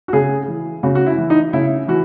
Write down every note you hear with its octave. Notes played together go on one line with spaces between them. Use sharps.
F#4
C#3 G#4
E3
C#3 F#4
F#4
E4
E3
D#4
C#3 E4
E3 F#4